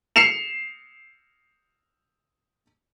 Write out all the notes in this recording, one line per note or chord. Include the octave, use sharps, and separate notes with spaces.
C7 C#7 E7 F7